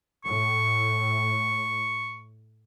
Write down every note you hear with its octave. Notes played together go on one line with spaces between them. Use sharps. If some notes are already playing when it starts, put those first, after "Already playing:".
A2 C#6